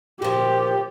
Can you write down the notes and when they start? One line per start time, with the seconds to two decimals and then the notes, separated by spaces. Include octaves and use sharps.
0.22 A#2 F3 G4